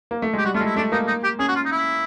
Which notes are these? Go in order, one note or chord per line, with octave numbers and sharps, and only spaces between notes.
A#3
A3
G#3 G4
G3 F#4
A3 F4
G#3
E4
A3 D4
A#3 D#4
D#4
G4
C#4 G#4
F#4
F4
D#4
E4